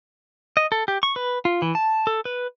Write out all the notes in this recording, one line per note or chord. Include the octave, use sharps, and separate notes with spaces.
D#5
A4
G4
C#6
B4
F4
E3
A5
A4
B4